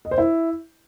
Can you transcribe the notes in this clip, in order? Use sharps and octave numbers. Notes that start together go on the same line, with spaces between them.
D#5
C5
E4